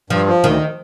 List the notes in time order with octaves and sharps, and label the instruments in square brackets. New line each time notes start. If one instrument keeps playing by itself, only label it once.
[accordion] G2 [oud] F3
[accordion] F3
[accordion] D2 [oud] D#3